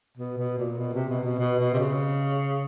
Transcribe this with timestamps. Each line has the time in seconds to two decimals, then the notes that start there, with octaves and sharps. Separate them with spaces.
0.17 B2
0.38 B2
0.58 A#2
0.78 B2
0.93 C3
1.09 B2
1.24 B2
1.39 B2
1.59 B2
1.73 C3
1.79 C#3